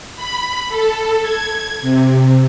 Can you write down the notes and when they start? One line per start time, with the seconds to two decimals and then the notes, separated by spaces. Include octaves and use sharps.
0.15 B5
0.69 A4
1.22 G#6
1.82 C3